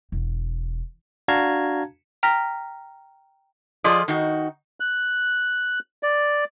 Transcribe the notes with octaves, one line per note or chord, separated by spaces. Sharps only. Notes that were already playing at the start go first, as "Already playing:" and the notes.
E1
D4 F#4 F5 A5 A#5 G#6
G5 A#5 F6 A#6 B6
F3 F4 G#4 A4 D5 D#5
D#3 D#4 F#4
F#6
D5